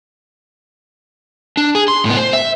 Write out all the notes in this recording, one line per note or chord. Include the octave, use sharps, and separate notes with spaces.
D4
G#4
C6
A2 B3
C5
E5